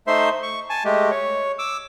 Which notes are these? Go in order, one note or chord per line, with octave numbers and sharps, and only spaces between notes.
A3 D#4 C5 E5 C6
C#6
G#5 A5
G#3 A3 G4
C#5
D6 E6